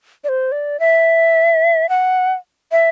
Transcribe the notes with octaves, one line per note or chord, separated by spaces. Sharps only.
D5
C5
D5
E5
F#5
E5